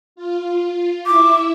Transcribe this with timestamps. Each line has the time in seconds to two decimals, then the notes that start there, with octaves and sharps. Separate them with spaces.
0.16 F4
1.07 E4 E5 D6